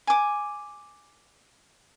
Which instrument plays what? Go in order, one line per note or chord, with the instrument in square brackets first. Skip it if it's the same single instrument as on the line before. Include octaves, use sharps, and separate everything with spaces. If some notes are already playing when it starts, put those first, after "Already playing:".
[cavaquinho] G#5 D6